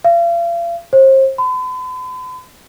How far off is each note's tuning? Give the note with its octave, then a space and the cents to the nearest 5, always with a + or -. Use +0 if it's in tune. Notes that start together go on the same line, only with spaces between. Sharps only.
F5 -40
C5 +35
B5 +45